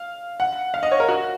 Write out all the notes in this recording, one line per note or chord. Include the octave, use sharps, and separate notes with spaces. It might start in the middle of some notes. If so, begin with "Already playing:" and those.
Already playing: F5
F#5
F5
D#5
C#5
A#4
F#4